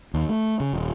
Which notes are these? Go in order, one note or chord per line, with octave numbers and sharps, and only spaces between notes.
D#2
A3
C#3
D#1